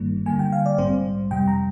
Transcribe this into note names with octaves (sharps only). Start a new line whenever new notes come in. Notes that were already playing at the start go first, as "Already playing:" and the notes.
Already playing: G1 G2 D#3 G3 A#3
D2 D3 G3 A#3 G#5
G5
F5
D5
A#1 G#2 G3 C4 C5
F2 C3 G3 G5
A#5